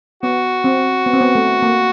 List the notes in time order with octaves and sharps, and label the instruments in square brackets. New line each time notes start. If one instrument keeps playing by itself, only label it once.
[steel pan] B3 [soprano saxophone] F#4
[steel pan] C4
B3
C4
B3
A3
A#3